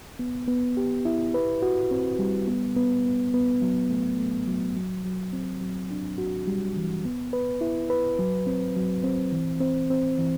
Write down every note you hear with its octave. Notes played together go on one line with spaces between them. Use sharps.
B3
B3
G4
E4
B4
F#4
C4
G3
B3
B3
B3
B3
F#3
A3
A3
F#3
F#3
F#3
C4
F#3
D4
F#4
G3
E3
B3
B4
E4
B4
F#3
C4
F#3
C4
E3
C4
C4
E3